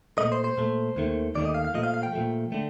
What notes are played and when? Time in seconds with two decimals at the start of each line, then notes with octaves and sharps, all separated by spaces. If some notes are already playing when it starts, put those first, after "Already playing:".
0.18 A#2 A3 D#5
0.32 C5
0.44 C5
0.57 A#2 A3
0.96 D#2 D#3 A3
1.35 D#2 D#3 A3 D5
1.45 D#5
1.54 F5
1.65 F5
1.74 A#2 F3 A3 D#5
1.83 F5
1.94 F5
2.03 G5
2.13 A#2 F3 A3
2.52 D3 A3